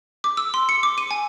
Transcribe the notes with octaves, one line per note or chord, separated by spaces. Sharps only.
D6
E6
C6
C#7
D6
D#7
G#5